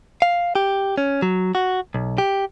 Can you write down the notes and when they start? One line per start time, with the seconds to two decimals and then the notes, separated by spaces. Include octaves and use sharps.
0.22 F5
0.55 G4
0.98 C#4
1.22 F#3
1.55 F#4
1.94 B1
2.18 G4